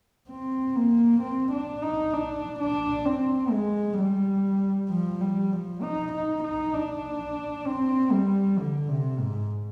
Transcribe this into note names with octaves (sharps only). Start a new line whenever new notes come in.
C4
A#3
C4
D4
D#4
D4
D4
C4
G#3
G3
F3
G3
F3
D#4
D#4
D#4
D4
C4
G3
D3
C3
G#2